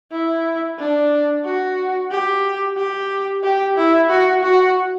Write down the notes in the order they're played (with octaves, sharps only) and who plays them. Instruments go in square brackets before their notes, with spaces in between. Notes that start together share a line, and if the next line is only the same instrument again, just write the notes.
[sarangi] E4
D4
F#4
G4
G4
G4
E4
F#4
F#4